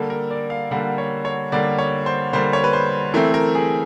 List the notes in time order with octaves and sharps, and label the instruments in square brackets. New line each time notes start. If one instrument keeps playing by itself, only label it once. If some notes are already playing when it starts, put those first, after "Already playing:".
Already playing: [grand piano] D3 G3 A#3 A4
A#4
D5
F5
D3 G3 A#3 F#5
C#5
C#5
D3 G3 A#3 D5
C#5
C5
D3 G3 A#3 C5
C#5
B4
C5
E3 A3 C4 A#4
A#4
G#4